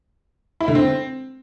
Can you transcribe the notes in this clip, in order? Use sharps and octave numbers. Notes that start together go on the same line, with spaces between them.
E4
D3
C4